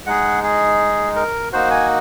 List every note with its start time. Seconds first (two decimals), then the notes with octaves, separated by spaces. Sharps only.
0.06 G#3 D#4 G#4 F#5
0.44 G#4
1.16 A#4
1.53 A#3 D#4 F#4 C5
1.71 G#5